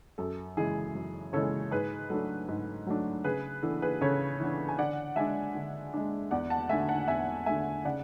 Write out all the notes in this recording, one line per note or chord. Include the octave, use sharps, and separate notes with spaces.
F#2 A4
C#3 E3 G#3 G#4
F#2
C#3 E3 G#3 A4 C#5
G#2 G#4 B4
F#3 A3 D4 A4
G#2
F#3 A3 D4
C#3 G#4 B4
E3 B3 D4 A4
G#4 B4
C#3 A4 C#5
E3 B3 D4
G#5
D3 D5 F#5
G#3 D4 E5 G#5
D3
G#3 D4
E2 D5 F#5
F#5 A5
D3 A3 E5 G#5
F#5 A5
E2 E5 G#5
D3 A3 E5 G#5
C#3 D5 F#5